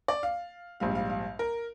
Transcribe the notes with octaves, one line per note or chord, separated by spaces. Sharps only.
D5
F5
A#1 G#2 G3 F5
F5
F5
A#4